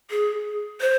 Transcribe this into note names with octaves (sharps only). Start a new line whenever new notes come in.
G#4
C5